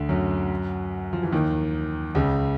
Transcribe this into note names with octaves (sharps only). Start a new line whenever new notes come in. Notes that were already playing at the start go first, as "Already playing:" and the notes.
Already playing: D2 D3
F#2 F#3
F3
E3
D#2 D#3
C#2 C#3